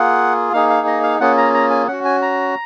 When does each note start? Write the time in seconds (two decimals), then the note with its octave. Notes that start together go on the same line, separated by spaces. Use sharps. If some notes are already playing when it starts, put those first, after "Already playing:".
Already playing: A#3 F4 G#4 F#5
0.53 A#3 D#4 G#4 F5
0.70 F5
0.87 D#5
1.03 F5
1.20 A#3 C#4 F4 G#4 F#5
1.37 A#5
1.54 A#5
1.71 G#5
1.88 C#4 F#4 F#5
2.05 G#5
2.22 A#5